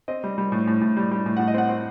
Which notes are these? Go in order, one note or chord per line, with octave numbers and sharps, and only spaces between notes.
C4 D#5
G3
G3
A2
A2
A2
G3
G3
A2
A2 F#5
D#5
C4 F#5
C4